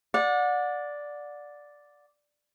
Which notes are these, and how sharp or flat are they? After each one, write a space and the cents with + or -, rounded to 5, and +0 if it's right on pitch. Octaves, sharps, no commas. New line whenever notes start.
D5 +0 F#5 -35